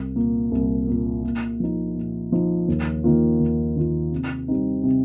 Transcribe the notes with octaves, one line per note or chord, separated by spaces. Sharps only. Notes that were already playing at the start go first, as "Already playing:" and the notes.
Already playing: C2
A#2 A#3
C2
A#2 A#3
A#2
F3 D#4
A#2
F3 D#4
D#2
D#3 A#3 F4
D#2
D#3 A#3 F4
C3
G3 C4 D#4
C3